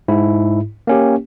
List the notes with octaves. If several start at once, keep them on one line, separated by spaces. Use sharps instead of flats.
G#2 E4
A#3 C#4 G4